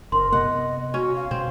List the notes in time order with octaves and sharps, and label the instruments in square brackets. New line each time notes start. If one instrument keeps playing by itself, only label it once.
[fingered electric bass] F#1 [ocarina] A#4 [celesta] C6
[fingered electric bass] C3 B3 [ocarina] D#5 [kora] F#5
[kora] C#4 [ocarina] F#4
[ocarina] F5
[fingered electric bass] B2 [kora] C4